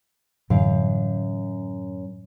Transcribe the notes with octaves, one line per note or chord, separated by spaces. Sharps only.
F#2 A2 D3 E3 F5